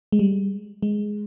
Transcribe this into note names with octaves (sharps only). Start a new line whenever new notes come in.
G#3
G3
G#3